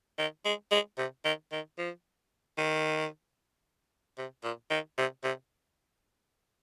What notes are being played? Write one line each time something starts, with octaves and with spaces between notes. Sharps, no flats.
D#3
G#3
G#3
C3
D#3
D#3
F3
D#3
C3
A#2
D#3
C3
C3